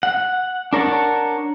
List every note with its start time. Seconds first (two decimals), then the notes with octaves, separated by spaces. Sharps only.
0.03 F#5
0.73 D4 A#4 C#5 F#5 A5